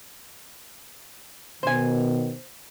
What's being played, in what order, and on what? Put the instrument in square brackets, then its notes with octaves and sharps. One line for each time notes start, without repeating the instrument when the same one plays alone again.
[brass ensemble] B2 D#3 [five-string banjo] C5 G#5